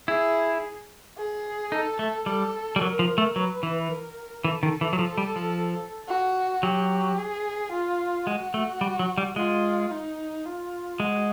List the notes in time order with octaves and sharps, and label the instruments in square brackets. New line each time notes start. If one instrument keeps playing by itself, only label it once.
[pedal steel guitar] E4 [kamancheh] G#4
[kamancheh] G#4
[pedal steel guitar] D#4 [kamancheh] A4
[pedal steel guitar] A3
[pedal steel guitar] G3 [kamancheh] A4
[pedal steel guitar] G3
[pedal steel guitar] F#3 [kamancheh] A#4
[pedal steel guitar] F3
A3
[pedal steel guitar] F#3 [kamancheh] B4
[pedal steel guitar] E3
[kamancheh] A#4
[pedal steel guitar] E3 [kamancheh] A4
[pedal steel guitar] D#3
E3
F#3
F3
G3
F3
[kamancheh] F#4
[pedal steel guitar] F#3 [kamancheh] G4
[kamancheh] G#4
F4
[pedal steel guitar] G#3 [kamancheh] F#4
[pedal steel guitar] A3
G3
F#3
G3
[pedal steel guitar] G#3 [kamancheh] F4
[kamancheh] D#4
F4
[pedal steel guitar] G#3 [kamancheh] F#4